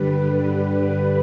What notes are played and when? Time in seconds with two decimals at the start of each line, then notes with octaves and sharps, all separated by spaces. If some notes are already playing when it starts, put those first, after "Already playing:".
Already playing: G2 D3 G3 B4